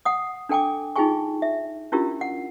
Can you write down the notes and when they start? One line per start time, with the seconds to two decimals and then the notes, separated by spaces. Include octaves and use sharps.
0.05 F#5 D#6
0.49 D4 A4 G5 G#5 D6
0.96 D#4 F4 G#4 G5 G#5 C#6
1.42 E5
1.92 C#4 D4 E4 F4 G4 A#4
2.21 F#5